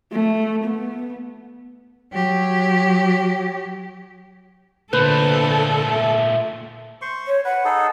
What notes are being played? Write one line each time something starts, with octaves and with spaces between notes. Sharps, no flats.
A3
B3
F#3 G4
A#2 D3 A3 A4 B4 C5
E5
C5 C6 C#6
C#5
B4 F#5
D#4 G#4 A4